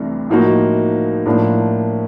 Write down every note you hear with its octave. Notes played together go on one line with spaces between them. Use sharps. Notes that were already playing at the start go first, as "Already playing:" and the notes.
Already playing: C2 C3 E3 A3 D4
A2 F3 A#3 D#4 F#4
A2 F3 A#3 D4